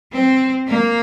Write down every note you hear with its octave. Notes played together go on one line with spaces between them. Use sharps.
C4
A#3